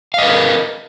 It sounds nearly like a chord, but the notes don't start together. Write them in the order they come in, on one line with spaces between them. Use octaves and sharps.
F5 D#5 B4 A#4